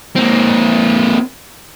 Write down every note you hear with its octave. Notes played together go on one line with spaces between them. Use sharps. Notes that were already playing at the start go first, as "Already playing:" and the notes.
A#3 C4